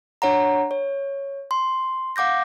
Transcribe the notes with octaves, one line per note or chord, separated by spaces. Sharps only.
D4 C#5 F#5 A#5
C#5
C6
F5 F#5 D6 G6 A#6